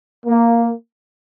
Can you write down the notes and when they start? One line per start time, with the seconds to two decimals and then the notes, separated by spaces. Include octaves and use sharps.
0.27 A#3